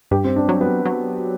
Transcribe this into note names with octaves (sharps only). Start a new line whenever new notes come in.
G2 G4
C4
D4
F#3
B3
F#3